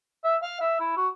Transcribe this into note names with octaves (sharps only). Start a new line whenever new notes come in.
E5
F5
E5
E4
F#4